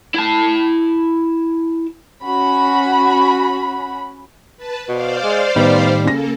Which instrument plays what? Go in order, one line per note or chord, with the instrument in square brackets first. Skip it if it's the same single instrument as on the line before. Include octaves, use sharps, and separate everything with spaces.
[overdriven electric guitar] E4 A5
[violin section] C#4 F#4 B5
[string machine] B4 A5
[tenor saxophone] B2 [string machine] C5 D5 F5
[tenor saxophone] G#3
[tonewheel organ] A2 D#3 [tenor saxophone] G3 [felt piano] B3 D#4
[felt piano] C#3 A#6 [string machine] A#3 A4